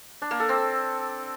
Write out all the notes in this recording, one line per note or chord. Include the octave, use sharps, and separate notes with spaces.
D4
A#3
A4
C4